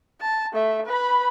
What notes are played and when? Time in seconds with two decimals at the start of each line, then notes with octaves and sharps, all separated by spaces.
0.21 A5
0.53 A3 E5
0.86 B4 B5